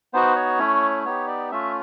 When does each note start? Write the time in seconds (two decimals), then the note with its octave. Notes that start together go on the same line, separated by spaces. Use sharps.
0.14 B3 D#4 F#4 C5
0.36 C#5
0.59 A3 C#4 E4
1.05 B3 D#4 G4 C#5
1.28 D5
1.51 A3 C#4 F4 E5